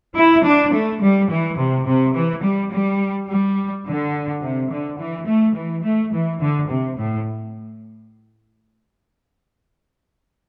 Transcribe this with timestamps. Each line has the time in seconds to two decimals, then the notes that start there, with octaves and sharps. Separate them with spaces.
0.16 E4
0.44 D4
0.73 A3
1.02 G3
1.29 E3
1.58 C3
1.87 C3
2.14 E3
2.43 G3
2.71 G3
3.28 G3
3.86 D3
4.42 C3
4.70 D3
4.99 E3
5.27 A3
5.56 E3
5.85 A3
6.13 E3
6.41 D3
6.69 C3
6.97 A2